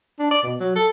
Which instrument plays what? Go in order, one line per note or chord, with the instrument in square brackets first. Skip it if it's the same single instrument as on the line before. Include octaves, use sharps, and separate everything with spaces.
[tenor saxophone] D4
D5
B2
F#3
A4